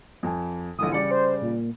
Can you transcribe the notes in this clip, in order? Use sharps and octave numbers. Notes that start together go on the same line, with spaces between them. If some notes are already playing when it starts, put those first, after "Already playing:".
F2 G#5
A#1 D3 E3 D#6
C#3 G3 D5 C#7
C5
A#2